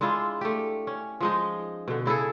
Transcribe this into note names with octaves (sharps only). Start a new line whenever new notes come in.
G#3 D4 E4 F4
A3 G4
C#4
F3 G#3 D#4
B2 D3
C#3 E4 G#4 A4